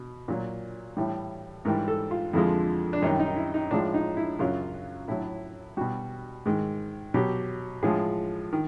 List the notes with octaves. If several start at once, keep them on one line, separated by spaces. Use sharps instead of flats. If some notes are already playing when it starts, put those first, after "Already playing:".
Already playing: B2
A#2 F#3
A2 E3 G3
G#2 E3 G3 A#4
A4
F4
F2 D3 F3 G#3 E4
D4
F#2 D#3 G3 D#4
D#4
E4
D#4
A2 F3 G#3 D4
D#4
E4
F#2 C#3 F#3 F4
A2 F#3 E4
B2 G3 F#4
G#2 D#3 G#3
B2 F#3 G4
A2 F3 G#3 G#4
D#3